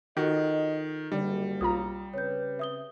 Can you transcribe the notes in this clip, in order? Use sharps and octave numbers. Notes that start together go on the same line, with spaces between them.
D#3 F4 F#4 A4 A#4 D#5
F#1 D3 G3 D4
B1 F4 A#5 D#6
C#3 C4 B4 C#5 G6
E5 D#6 G7